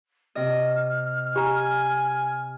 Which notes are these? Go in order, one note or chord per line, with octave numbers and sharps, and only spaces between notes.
C3 D#5 F6
G4 G#5 A#5